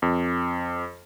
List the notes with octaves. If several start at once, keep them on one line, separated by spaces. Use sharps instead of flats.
F2